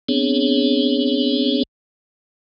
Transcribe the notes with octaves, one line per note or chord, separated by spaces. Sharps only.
B3 C4 D4 G#4 C#5